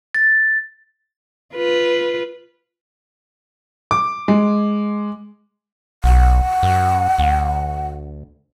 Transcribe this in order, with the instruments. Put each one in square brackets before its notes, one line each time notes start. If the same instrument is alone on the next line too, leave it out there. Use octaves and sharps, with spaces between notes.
[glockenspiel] A6
[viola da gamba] F4 B4
[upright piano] D6
G#3
[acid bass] B1 [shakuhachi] F#5
[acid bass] F#2
D2